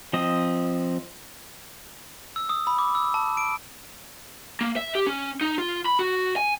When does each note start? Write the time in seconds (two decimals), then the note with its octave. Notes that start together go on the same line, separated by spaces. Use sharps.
0.13 F3 C4 D#5
2.36 E6
2.49 D#6
2.67 B5
2.78 D6
2.95 E6
3.14 A5
3.37 D7
4.61 A#3
4.76 E5
4.95 G4
5.07 C#4
5.41 D#4
5.58 F4
5.86 B5
5.99 F#4
6.36 G#5